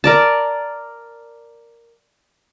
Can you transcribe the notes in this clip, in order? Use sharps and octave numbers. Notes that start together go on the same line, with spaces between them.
A#4 D5 A5